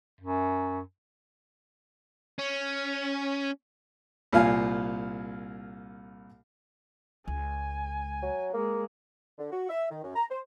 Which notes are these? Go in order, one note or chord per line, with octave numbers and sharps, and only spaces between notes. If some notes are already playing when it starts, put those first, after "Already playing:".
F#2
C#4
C2 A#2 F5 G#5
C#2 G#5
F#3
G#3 A#3
D3
F#4
E5
D#3
F#2
A#5
C5